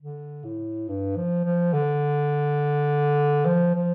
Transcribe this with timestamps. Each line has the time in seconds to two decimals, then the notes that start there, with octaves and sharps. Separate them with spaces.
0.02 D3
0.44 A2
0.88 G2
1.16 F3
1.45 F3
1.73 D3
3.46 F3
3.75 F3